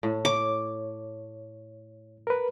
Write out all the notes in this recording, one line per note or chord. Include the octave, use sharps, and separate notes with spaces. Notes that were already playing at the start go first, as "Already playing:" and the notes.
A2
C#5 D6
A#4 B4